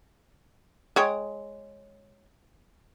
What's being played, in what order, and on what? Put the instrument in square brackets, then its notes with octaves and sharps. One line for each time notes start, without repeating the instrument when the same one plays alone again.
[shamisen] G#3 C#5 G5